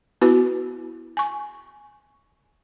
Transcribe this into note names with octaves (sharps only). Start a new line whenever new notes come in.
B3 E4 F#4 B4
G#5 C#6